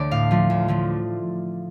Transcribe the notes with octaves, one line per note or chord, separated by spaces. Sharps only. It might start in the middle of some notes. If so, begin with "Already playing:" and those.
Already playing: D2 D3 A3 D5
A2 F5
F3 A3
D2
D3 F3 A3